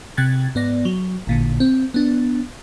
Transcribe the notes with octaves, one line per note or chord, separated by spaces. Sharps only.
C3 F#6 G#6 A6
G#2 B3 D5 A#6
F#3
A1 A#2 D3
C4
B3 D4